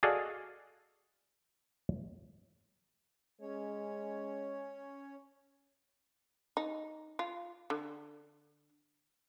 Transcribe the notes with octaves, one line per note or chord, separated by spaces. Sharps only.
F#4 G#4 A4 D5 D#5 F5
G#3 C#4 C#5
D#4
F4
D3